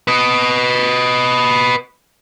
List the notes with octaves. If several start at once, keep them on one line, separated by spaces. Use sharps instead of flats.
B4 D#5